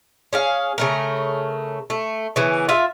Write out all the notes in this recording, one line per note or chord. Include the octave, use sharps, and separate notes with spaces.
C#4 G#4 F5
C#3 A3 A#4
A3
C#3 E3 B3
F4 E5